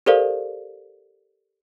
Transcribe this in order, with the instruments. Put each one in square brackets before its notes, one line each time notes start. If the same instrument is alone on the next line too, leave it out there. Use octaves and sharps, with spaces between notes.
[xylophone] G4 A4 A#4 C5 D5 F5